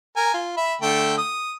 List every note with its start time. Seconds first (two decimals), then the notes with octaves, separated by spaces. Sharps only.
0.16 A#4 G#5
0.34 F4
0.57 E5 B5
0.81 D3 A3 G5
1.18 D#6